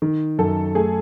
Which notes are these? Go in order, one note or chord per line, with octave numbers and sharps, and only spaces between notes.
D#3
F#2 A4
A3 G#4